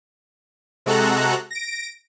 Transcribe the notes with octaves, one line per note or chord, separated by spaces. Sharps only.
C3 G#3 F#4 A4 A#5 F#6
A#6 D7